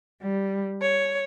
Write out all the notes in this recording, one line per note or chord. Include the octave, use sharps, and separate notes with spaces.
G3
C#5